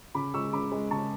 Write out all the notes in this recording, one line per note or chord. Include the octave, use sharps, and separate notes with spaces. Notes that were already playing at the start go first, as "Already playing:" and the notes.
C#3 B5 D6
G#3 C#6 E6
C#3 B5 D6
G#3
C#3 A5 C#6